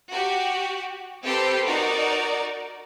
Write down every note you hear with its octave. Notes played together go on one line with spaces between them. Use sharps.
F#4 G4
C4 G4 A4 B4 C5 C6
D#4 F#4 A#4 D5